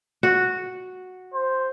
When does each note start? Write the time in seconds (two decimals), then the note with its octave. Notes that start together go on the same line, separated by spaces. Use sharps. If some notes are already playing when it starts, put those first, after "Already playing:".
0.23 F#4
1.34 C5